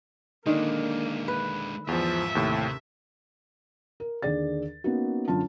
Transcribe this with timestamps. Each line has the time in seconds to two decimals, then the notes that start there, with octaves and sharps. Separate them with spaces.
0.46 D3 D#3 G#3 A#3 D4
1.28 B4
1.88 E2 G#2 F3 F4 E5
2.35 D#2 A2 C3
4.00 A#4
4.22 D#2 D3 G#4 D5 A6
4.84 A#3 B3 C#4 D#4 F#4
5.28 F#2 D3 F4 A5